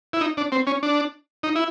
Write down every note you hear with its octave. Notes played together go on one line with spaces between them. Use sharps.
E4
D#4
D4
C4
C#4
D4
D#4
E4